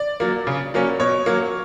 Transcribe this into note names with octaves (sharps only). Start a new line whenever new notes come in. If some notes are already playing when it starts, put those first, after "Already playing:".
Already playing: D5
F#3 A#3
C#3
F#3 A#3 C#4
B2 C#5
F#3 A#3